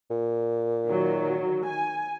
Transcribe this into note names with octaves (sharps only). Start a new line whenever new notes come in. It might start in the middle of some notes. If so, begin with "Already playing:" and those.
A#2
D#3 F#3
G#5